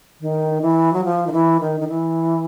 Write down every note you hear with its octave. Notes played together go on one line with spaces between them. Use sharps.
D#3
E3
F#3
F3
D#3
E3
D#3
D#3
E3